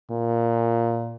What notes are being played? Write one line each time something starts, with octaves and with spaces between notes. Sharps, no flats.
A#2